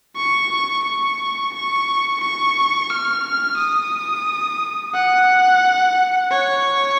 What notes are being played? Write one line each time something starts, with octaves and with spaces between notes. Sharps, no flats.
C#6
C#6
C#6
C#6
F6
D#6
F#5
C#5